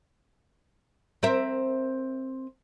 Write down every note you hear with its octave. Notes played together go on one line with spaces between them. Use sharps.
C4 A#4 E5